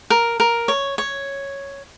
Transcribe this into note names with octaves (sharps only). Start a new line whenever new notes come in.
A#4
A#4
C#5
C#5